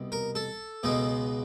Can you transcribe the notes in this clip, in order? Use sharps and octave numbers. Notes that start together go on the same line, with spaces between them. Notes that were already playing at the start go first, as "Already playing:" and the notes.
Already playing: C2 B2
A#4
A4
C#2 B2 G#3 B3